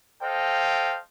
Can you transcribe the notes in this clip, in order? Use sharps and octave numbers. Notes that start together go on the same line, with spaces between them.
A4 C5 D#5 F5 G5